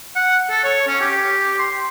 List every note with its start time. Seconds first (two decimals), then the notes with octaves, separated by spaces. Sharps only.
0.15 F#5
0.50 A4
0.64 C#5
0.87 C#4
1.01 G4
1.59 C6